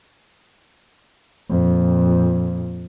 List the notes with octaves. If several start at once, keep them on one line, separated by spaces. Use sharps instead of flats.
F2 A#2